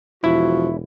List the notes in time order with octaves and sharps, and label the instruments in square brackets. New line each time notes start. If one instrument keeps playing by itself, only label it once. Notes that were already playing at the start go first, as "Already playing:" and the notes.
[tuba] E1 [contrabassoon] F3 [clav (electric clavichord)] E4 [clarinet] F#4